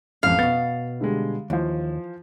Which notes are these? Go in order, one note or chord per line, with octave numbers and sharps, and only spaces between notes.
A1 F2 F5
B2 B3 A6
D3 G3 G#3
D#2 E3 F3